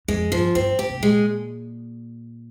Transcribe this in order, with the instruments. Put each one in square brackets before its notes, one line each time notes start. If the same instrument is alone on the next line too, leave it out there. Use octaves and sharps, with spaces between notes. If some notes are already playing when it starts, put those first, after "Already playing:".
[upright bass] F2 [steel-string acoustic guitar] G#3
[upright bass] G2 [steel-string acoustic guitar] F3
[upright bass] G2 [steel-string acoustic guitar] C4
[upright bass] A#2 [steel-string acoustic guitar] G4
[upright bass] C3
[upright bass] A#2 [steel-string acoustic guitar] G#3